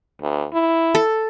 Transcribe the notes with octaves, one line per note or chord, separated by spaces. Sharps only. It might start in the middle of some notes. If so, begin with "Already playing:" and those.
D2
E4
A4